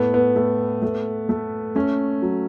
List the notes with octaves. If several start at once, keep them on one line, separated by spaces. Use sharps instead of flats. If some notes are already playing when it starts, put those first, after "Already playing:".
Already playing: A2 A3 B3
B3
A3
A3
A3
A3 C#4
F#3